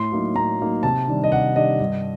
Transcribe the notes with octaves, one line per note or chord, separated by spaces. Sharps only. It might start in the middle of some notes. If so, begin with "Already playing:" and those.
Already playing: A2 C6
F#3 A#3 D#4
A2 A#5
F#3 A#3 D#4
C3 A5
D#3 G3 D4
D#5
C3 F#5
D#3 G3 D4 D#5
G2